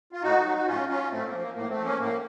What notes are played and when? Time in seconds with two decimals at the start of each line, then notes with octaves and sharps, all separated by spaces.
0.12 F4
0.23 A2 D#4 F#4
0.45 F#3
0.57 F#4
0.67 A2 C#4 F4
0.89 F#3 C#4 F4
1.11 A2 A3 C4
1.26 A#3
1.33 F3
1.40 A#3
1.55 A2 A#3
1.69 A3 C4
1.77 F3
1.84 A#3 C#4
1.99 A2 A#3